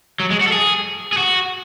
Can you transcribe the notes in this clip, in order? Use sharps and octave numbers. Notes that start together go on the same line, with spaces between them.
F#3
G#3
F#4
A4
G#4
G#4
F#4